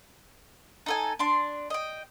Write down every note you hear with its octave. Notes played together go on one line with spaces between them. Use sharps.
D#4 A4 G#5
D4 C6
D#5 G5